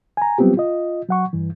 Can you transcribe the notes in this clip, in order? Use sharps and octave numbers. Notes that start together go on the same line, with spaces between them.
G#5 A#5
F#3 G3 B3 C4 F4 G4
F4 D#5
F#3 F#5 C#6
G2 E3